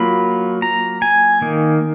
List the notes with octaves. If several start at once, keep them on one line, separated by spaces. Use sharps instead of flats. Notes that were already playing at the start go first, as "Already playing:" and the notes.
Already playing: F#3 A#3 F4 B5
A#5
G#5
D#3 A#3 D#4